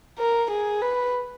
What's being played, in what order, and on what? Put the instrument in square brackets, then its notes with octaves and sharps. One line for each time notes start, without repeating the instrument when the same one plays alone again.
[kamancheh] A#4
G#4
B4